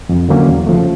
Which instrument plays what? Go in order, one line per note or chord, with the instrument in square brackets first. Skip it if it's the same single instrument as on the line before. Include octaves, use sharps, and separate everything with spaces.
[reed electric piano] F2
D3 F#3 A#3 C#4
E2
C#3 F3 A3